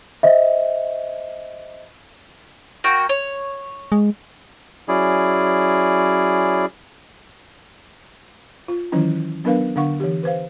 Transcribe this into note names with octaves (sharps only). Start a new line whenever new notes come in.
C5 D#5 E5
A#3 F#4 G5
C#5
G#3
F#3 C#4 E4 G#4 D5
F4
D#3 E3 F#3 C#4 E4
F#3 B3 D4 A#4 B4 F5
D3 D4 F5 F#5 C#6
E3 G4
B4 C5 F5